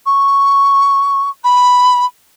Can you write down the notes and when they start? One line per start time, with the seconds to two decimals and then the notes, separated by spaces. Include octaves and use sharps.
0.06 C#6
1.43 B5